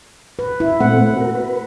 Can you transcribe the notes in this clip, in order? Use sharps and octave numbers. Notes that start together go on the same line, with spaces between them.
B4
E4
A#2 A3 C4 F#5
F#4 A#4
B4